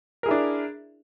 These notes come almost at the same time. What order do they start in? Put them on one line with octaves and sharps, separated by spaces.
A#4 G#4 E4 D4